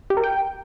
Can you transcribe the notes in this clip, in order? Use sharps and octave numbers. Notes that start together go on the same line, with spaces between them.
G4
A#4
G5